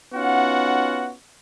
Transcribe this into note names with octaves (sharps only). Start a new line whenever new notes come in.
B3 C#4 D#4 F4 F#4 F#5